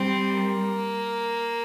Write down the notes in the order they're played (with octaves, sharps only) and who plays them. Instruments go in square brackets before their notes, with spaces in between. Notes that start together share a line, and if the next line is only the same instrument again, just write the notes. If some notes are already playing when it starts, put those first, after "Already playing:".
Already playing: [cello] G3 [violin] C4
[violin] A#3